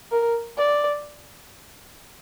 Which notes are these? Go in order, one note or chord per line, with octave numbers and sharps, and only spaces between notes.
A#4
D5